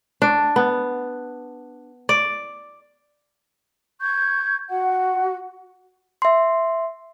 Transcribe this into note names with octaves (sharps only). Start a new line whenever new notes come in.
D4
B3
D5
C#6 G6 G#6
F#4 F#5
E5 C6